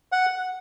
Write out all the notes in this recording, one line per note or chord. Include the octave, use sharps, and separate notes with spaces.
F#5